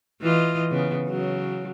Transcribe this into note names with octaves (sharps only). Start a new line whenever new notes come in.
E3 F4 D#5
C#3 B3
C#3 F#3